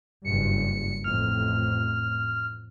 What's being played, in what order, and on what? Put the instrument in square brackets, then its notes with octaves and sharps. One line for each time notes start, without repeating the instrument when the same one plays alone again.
[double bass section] F#1 G2 [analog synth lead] C#7
[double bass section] A1 F2 A2 [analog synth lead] F6